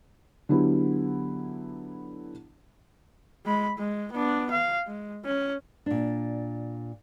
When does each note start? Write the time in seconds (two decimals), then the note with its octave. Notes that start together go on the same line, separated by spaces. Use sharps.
0.49 D3 F#3 B3 E4 G4
3.46 G#3 B5
3.78 G#3
4.12 B3 D4
4.51 F5
4.87 G#3
5.25 C#4
5.86 A#2 D4